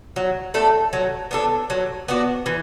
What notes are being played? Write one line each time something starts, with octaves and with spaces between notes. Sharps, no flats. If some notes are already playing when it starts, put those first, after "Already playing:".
F#3
A3 D4 A4
F#3
B3 D4 A4
F#3
B3 D4 F#4
E3